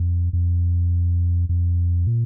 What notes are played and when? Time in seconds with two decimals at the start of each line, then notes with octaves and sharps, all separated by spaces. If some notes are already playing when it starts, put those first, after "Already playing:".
Already playing: F2
0.33 F2
1.49 F2
2.07 A#2